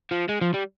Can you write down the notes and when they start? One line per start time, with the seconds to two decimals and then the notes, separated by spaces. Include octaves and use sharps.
0.11 F3
0.29 G#3
0.41 F3
0.54 G3